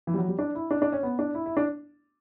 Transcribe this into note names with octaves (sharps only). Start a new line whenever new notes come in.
E3
G3
F#3
G3
D4
E4
D4
D4
C#4
B3
D4
E4
E4
D4